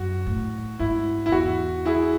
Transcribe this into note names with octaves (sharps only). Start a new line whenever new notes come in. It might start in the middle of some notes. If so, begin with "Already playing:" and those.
Already playing: F#2 F#4
A2
G#2 E4
F#2 E4
E2 F#4
E4 G#4